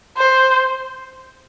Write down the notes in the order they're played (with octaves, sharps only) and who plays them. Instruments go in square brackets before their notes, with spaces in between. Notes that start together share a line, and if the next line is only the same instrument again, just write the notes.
[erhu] C5